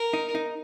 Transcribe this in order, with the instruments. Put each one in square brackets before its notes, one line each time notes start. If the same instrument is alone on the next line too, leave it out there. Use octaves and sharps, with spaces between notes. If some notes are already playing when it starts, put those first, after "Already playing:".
Already playing: [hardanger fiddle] A#4
[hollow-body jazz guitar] D#4
D#4